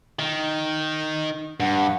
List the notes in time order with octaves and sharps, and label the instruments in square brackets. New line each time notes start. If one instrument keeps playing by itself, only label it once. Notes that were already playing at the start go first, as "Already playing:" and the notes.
[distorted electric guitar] D#3
[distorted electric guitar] G2 [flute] F#5